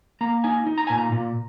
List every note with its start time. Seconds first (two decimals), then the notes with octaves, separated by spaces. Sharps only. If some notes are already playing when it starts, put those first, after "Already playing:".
0.21 A#3 A#5
0.44 D#4 G#5
0.67 D#4
0.78 A#5
0.87 A#2 G#5
0.98 A#5
1.12 A#2